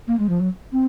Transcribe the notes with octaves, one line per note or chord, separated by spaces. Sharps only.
A#3
G#3
F3
F#3
C4